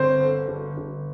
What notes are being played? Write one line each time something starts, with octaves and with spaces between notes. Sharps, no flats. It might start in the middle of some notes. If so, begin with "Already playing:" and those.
Already playing: G1 C4 C5
D3
G1
G1